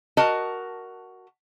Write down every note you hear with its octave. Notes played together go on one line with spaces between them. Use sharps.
F#4 A#4 D#5 A5